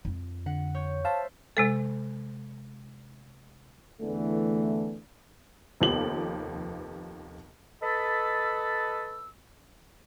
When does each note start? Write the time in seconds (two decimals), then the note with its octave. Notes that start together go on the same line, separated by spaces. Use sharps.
0.05 F2 F4
0.46 D3 F#5
0.75 C#5 G6
1.05 C5 E5 F5 A5
1.57 C3 G#3 A4
4.01 E2 D3 E3 A3
5.81 F1 D#2 F3 B3 G4 F#7
7.82 A4 B4 D#5 A5 B5 E6